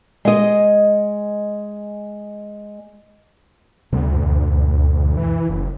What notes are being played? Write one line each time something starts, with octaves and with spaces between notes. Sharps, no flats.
G#3 D#5
D2 C3 G3 B3
C#2 F#2 B2
E3
F#1